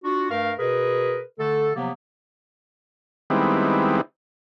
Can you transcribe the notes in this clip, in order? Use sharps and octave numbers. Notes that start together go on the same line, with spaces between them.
D4 F4 F#4
G2 A3 A#4 F5
B2 G#4 A#4 B4
D3 A3 A4
C3 F3 F#3 A#3 B3
D#3 G3 G#3 B3 C4 E4